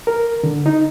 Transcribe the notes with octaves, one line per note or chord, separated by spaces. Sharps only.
A#4
D3
D#4